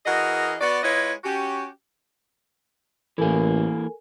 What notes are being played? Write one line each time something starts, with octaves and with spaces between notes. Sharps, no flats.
E3 F#4 G#4 A#4 D#5
B3 F#4 D5
G#3 E4 F4 B4 C#5 D#5
C#4 F#4 G4
A1 E3 A#3 A4 A#4 G#5